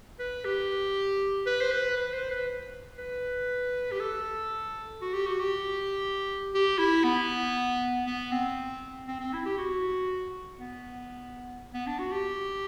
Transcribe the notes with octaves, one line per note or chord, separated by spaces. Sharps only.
B4
G4
B4
C5
B4
B4
C5
B4
B4
G4
A4
F#4
G4
F#4
G4
G4
E4
B3
B3
C4
C4
C4
E4
G4
F#4
B3
B3
D4
F#4
G4